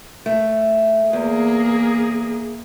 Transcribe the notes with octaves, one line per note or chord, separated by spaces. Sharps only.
A3
E2 A#3 G#4